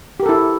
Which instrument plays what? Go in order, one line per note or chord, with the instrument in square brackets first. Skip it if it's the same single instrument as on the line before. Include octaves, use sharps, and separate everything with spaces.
[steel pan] G4
A#4
A4
E4